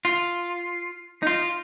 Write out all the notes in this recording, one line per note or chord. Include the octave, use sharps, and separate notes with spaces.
F4
D#4
F4